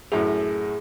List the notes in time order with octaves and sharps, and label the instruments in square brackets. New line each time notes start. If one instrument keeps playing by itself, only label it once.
[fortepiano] F#2 A2 [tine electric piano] G#4